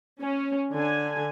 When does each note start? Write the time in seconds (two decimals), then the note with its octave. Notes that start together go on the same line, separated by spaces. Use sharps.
0.21 C#4
0.74 D3 G#5